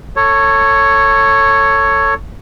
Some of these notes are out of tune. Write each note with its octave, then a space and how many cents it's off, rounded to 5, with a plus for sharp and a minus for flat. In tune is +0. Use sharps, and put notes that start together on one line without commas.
A4 +20 C#5 +0